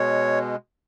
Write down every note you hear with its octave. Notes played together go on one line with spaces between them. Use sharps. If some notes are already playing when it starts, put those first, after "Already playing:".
Already playing: B2 G#3 C#5